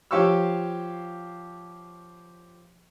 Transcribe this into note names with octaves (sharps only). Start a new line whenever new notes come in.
F3 G4 C#5 F5 C#6 E6